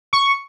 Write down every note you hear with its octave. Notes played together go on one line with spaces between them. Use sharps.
C#6